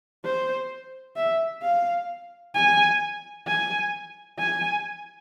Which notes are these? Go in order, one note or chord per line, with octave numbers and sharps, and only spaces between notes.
C5
E5
F5
G#5
G#5
G#5